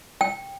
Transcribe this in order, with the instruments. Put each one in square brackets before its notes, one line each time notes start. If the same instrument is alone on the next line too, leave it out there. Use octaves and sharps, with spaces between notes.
[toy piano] G5